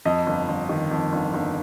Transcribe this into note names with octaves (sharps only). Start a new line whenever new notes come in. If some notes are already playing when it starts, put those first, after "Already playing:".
F2 D#5
G1
G1
D#3
F2
G1
G1